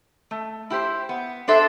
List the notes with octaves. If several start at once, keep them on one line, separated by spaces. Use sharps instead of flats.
A3
E4 G4 C5
B3
D4 A4 C5 E5